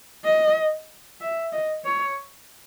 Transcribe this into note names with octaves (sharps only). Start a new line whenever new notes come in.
D#5
E5
D#5
C#5